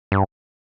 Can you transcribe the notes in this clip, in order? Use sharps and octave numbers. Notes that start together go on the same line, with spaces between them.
G2